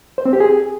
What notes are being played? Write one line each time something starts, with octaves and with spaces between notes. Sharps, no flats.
C5
C4
G4
G#4